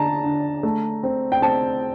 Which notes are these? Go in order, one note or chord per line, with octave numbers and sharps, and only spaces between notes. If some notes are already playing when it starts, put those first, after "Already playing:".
Already playing: D3 A5 A#5
D3
A3
C4
G5
C4 A5